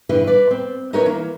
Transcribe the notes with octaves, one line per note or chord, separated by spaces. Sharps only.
G2 C#3 E3 B4
B4 D5
C4
D#4 E4 A#4 B4 C#5
E3 A#3